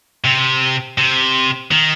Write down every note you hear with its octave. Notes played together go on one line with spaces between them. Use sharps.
C3
C3
D#3